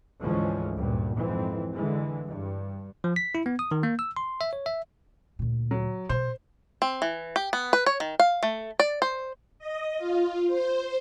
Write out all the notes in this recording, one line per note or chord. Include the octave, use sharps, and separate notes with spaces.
D2 G#2 E3 F3 G#3 C#4
D2 G2 A#2
F2 G#2 E3 C4
D3 E3 G#3
G2
F3
B6
E4
B3
D#6
D#3
A#3
E6
C6
E5
C#5
E5
D2 A#2
F#3
B2 C5
C4
E3
G4
B3
B4
C#5
D#3
F5
A3
D5
C5
D#5
F4
C5